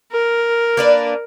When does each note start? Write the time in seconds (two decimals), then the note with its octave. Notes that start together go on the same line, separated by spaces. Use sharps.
0.12 A#4
0.77 A#3 D4 B4